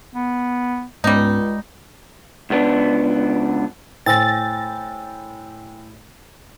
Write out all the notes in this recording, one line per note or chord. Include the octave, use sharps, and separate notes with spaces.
B3
C#2 G#2 G3 G#3 B3 C#4 D#4
C#2 B3 D4
A2 C5 G5 G#5 E6 A6 A#6